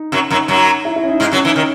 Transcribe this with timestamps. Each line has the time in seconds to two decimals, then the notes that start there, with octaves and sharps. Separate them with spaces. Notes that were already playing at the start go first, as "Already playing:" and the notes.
Already playing: D#4
0.12 F#2 F#3 C#4
0.30 F#2 F#3 D#4
0.48 F#2 F#3 D#4
0.85 E4
0.96 E4
1.03 C#4
1.08 D#4
1.20 G#2 G#3 D#4
1.32 F#2 F#3 C#4
1.44 E3 D#4
1.56 D#3 C#4